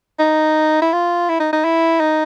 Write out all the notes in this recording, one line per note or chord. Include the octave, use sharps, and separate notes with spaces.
D#4
E4
F4
E4
D#4
D#4
E4
D#4